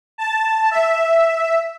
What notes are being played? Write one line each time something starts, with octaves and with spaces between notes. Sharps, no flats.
A5
E5